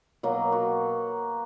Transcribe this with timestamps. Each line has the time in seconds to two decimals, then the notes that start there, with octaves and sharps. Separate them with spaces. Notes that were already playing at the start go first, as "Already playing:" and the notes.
0.23 B2 F#3 A#3
0.52 F#4